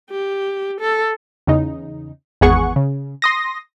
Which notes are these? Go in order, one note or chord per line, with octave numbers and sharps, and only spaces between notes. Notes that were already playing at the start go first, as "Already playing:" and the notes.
G4
A4
E2 C#3 D#4
G#1 E2 B3 G#4 F#5 C#6
C#3
C6 D#6 A#6